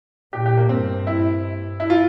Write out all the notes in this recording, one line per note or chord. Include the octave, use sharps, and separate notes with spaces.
A#2 G4
G4
A#3
G2 C4
E4
E4
F4